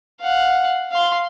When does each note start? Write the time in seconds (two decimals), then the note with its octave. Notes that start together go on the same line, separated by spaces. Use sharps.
0.21 F5 F#5
0.92 F5 C6